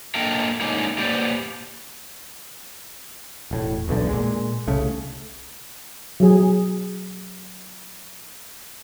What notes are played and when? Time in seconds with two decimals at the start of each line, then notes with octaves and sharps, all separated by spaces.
0.15 A#3 D4 A4 A#4 D#5 G5
0.61 D3 G#3 A#3 C#4 D#4
0.98 A#3 G4 B4 C5 D5
3.51 E1 A2
3.88 D#1 B1 E2 D3
4.09 A#2 G#3
4.67 C2 C#3 A3
6.20 F#3 G#4